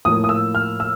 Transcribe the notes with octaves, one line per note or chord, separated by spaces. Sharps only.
A2 F3 A#3 D#6
D#6
E6
F6
E6